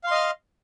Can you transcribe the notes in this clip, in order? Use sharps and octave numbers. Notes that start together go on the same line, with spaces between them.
D#5 F5 C6 F6